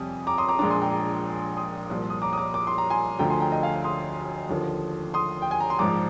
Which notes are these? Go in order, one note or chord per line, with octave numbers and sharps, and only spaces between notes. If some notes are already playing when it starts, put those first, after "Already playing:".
Already playing: F2 C3 G3 G#5 D#6
A#5 D6
C6 D#6
A#5 D6
A#1 A#2 G#3 D4 A#5 D6
G#5 C6
G5 A#5
A#5 D6
C6 D#6
C2 A#2 F3
D#6
A#5 D6
D#6
A#5 D6
D6
C6
A#5
G#5 C6
D2 D3 F3 G5 A#5
G#5 C6
G5 A#5
D#5 G5
F5 G#5
C6 D#6
D#2 D3 F3
C6 D#6
G5
G#5
A#5
C6
A#1 G#2 F3 A#5 D6